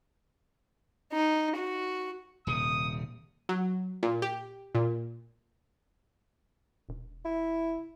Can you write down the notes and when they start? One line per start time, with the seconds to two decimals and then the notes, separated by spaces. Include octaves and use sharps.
1.13 D#4
1.56 F#4
2.47 D#1 C3 D#6
3.49 F#3
4.03 A#2
4.22 G4
4.75 A#2
6.89 E1
7.25 E4